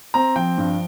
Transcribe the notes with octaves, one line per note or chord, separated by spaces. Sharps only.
C4 A#5
F3 G5
G2